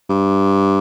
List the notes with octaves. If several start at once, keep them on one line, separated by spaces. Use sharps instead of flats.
G2